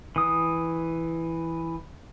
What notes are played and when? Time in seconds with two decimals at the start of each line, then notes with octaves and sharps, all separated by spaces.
0.16 E3 D#6